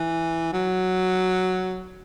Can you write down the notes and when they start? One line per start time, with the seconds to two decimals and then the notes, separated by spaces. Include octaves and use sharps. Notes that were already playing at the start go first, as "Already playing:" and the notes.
Already playing: E3
0.53 F#3